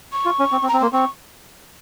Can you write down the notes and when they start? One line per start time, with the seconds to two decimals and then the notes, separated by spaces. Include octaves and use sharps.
0.13 C#6
0.25 F4
0.39 C#4
0.52 C4
0.63 C4
0.68 A#5
0.73 C4
0.80 A#3 C6
0.93 C4 C#6